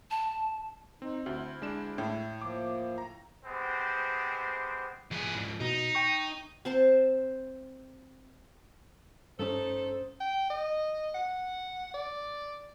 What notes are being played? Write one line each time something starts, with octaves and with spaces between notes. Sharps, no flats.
A5
C4 D#4
D2 E4
G#3 D4 E7
A2
F3 A#3 D6
A#5
G#3 B3 C4 G4 C5
F3 G#4
G#2 F3
B2 D#4
G5 C#6
C4 C5 A5
G2 A3 C#4 D#4 A4 C5
G5
D#5
F#5
D5